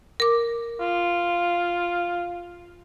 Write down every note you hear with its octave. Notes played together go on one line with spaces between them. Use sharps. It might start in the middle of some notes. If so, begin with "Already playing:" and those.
A#4 D6
F4